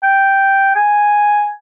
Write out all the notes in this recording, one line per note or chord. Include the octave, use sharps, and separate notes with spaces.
G5
G#5